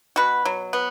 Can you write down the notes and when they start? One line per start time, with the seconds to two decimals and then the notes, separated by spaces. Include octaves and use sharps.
0.16 B2 F#4 B4
0.45 F#3
0.73 B3